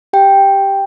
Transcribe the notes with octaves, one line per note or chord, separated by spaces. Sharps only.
G4 G5